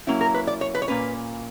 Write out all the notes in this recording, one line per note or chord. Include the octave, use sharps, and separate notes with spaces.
F#3 A#3 C#4 E4
A#4
B4
D5
C#5
B4
C#5
A#2 A#3 C#4 B4